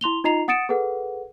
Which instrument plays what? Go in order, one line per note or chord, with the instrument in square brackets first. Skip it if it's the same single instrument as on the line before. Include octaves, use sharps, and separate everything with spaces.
[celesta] E4 C6 F7 G7
D#4 F4 D#5 A#5 C7 F7
F#5 D#6 A6 C#7 D7 E7
G#4 A4 B4 F#5